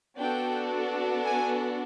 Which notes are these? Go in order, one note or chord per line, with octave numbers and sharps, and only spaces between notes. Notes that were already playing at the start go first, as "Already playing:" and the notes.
B3 D4 F#4 A4 G5
G#5